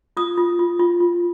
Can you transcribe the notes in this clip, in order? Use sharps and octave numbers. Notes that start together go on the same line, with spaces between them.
F4 D#6
F4
F4
F4
F4